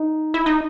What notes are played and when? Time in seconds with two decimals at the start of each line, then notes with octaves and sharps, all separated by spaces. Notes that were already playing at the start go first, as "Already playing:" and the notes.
Already playing: D#4
0.34 E4
0.46 D#4